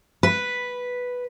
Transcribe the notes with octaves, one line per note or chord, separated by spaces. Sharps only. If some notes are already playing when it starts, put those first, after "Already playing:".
B4